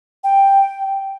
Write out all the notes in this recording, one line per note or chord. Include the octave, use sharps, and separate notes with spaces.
G5